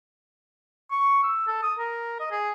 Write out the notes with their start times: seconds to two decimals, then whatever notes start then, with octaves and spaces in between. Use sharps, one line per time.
0.91 C#6
1.24 E6
1.47 A4
1.63 D#6
1.79 A#4
2.20 D#5
2.32 G#4